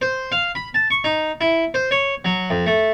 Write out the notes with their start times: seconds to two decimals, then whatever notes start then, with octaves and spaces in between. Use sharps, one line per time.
0.02 C5
0.32 F5
0.55 B5
0.74 A5
0.91 C#6
1.04 D#4
1.41 E4
1.74 C5
1.91 C#5
2.25 F#3
2.50 F2
2.66 A3